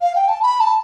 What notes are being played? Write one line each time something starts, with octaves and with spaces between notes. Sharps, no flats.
F5
G5
A5
B5
A5